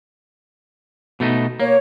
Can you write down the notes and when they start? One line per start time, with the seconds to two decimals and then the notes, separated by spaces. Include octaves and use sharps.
1.20 B2 A3 D#4
1.60 A#3 C#5